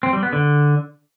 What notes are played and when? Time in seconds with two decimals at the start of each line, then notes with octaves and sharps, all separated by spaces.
0.03 C4
0.13 G3
0.23 B3
0.33 D3